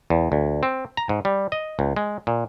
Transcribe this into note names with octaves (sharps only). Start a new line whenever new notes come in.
E2
D2
C4
A#5
G#2
G3
D#5
C#2
G#3
A#2